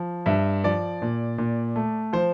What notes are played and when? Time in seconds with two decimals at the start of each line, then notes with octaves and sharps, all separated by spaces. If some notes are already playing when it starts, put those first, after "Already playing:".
Already playing: F3
0.26 G2 E5
0.64 F3 D5
1.02 A#2
1.38 A#2
1.76 A3
2.13 F3 C5